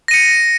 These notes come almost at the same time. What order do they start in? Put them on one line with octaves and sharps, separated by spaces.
A#6 D#7 C#7